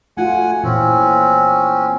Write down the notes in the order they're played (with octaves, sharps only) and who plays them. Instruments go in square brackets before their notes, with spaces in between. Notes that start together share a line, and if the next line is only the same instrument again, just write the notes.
[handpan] A3 F4 F#4 [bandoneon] F#5 G#5
[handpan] A#2 E3 [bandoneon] C4 C#4